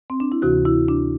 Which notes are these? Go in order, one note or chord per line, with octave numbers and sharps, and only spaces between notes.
C4
D4
E4
D2 C3 E3 F#4
E4
D4